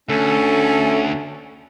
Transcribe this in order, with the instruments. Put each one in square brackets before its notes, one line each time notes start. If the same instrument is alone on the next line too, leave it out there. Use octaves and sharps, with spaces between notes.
[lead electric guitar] D2 [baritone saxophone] C#4 [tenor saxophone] A4